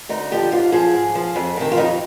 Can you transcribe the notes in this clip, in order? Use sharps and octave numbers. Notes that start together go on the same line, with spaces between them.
D2 D#4
D3 F3 G4
G#2 F4
F3 G#4
G#2
F3
F2
C3 D#3
F4
F2 D#4